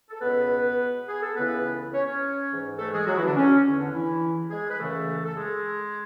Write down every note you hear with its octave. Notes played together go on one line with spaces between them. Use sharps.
A4
C#2 B2 B3 B4
G#4
A4
C#2 C#3 E3 B3 B4
C#4 C#5
C#4 C#5
G#2 E3
A3 A4
G#3 G#4
F#3 F#4
E3 E4
D3 D4
C#4
E2 D3 C#4
D3 D4
E3 E4
G#3 G#4
B4
F#2 C#3 E3 A3 A4
A4
G#3 G#4